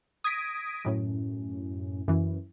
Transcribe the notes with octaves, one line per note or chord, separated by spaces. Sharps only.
D#6 G#6 A#6 B6 D7 D#7
F#2 A2 C#4
F#2 E3